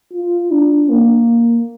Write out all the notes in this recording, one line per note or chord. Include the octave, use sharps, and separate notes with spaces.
F4
D4
A#3